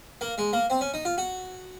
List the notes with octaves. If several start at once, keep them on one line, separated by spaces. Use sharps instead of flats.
A#3
G#3
A#3
C4
C#4
D#4
F4
F#4